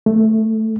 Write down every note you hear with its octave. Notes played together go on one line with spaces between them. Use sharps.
A3